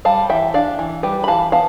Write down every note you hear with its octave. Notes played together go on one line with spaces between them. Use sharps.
G3 F5 A5
E3 E5 G5
D4 D5 F5
E3
G3 G4 B4
B5
E3 F5 A5
B3 F5 A5